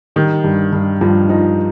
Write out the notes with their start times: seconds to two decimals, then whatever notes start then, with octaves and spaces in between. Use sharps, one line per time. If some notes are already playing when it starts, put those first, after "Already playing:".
0.16 D#3 G3
0.44 G2
0.73 G2
1.01 G2 F3
1.29 F3 D#4